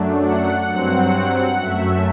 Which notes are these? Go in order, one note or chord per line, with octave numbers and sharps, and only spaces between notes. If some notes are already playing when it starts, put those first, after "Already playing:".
Already playing: F#2 F#3 A3 D4
F#5
G2 F#3 C4
F#2 F#3 A3 E5